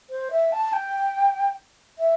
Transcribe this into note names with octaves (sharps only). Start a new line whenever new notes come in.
C5
E5
A5
G5
E5